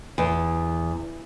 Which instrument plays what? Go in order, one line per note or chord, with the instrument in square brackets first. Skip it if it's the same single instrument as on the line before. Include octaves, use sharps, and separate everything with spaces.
[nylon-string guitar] E2